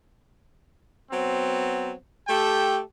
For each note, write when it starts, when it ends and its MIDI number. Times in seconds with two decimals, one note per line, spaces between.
1.12 1.92 54
1.12 1.92 59
1.12 1.92 60
2.28 2.80 57
2.28 2.80 67
2.28 2.80 69
2.28 2.80 79